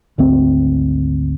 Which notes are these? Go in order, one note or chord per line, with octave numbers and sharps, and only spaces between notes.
G#1 D2 C4